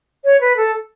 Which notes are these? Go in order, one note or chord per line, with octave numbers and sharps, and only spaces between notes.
C#5
B4
A4